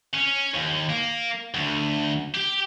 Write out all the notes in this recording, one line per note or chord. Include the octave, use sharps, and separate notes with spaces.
C#4
D#2
A#3
D2
G4